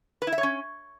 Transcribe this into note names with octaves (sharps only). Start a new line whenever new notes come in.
B4
E4
E5
C#5
C#4